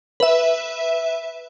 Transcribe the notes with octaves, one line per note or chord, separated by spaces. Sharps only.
B4 E5